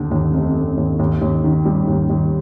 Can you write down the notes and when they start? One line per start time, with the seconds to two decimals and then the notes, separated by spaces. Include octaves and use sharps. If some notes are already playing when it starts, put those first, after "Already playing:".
Already playing: D#2 D3
0.11 D#2
0.33 F1
0.56 F1
0.77 D#2
0.99 D#2
1.21 D#2
1.44 D#3
1.65 G3
1.88 D#2
2.10 D#2